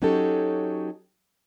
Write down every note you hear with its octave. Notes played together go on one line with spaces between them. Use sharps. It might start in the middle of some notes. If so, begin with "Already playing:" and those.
F#3 C#4 D#4 F#4 G4 A4